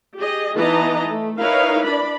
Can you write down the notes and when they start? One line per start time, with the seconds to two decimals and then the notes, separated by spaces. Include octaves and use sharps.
0.17 G4 G#4 D#5
0.57 E3 B3 D#4 D#5 A5 A#5
1.07 A3
1.39 D#4 E4 A#4 B4 C#5 F5
1.85 D4 D5 B5